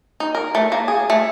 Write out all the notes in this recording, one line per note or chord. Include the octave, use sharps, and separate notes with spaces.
D#4
A#4
A3
A#3
G#4
A3